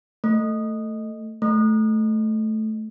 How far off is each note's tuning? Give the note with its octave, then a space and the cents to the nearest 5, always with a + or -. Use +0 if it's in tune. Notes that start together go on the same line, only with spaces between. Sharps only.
A3 +10
A3 -10